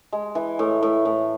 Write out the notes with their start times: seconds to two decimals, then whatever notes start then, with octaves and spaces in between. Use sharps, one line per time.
0.13 G#3
0.35 E3
0.59 A2
0.83 A2
1.05 A2